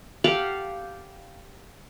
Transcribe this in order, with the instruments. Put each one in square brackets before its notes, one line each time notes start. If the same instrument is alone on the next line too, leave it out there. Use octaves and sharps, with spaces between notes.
[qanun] G4 A4 F5 F#5